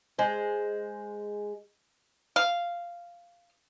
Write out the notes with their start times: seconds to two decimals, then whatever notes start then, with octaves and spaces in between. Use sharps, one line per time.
0.19 G#3 C5
2.36 F5